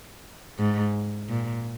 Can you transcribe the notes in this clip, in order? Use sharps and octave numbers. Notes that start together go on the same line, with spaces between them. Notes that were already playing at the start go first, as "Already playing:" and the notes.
G#2
A#2